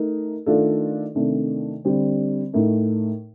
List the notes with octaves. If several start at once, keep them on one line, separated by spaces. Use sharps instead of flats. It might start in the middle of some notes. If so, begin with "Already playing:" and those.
Already playing: A3 D#4 A#4
D#3 A3 D4 F4 A4
C3 D#3 A3 D4
D3 G3 C4
A2 A3 D#4 A#4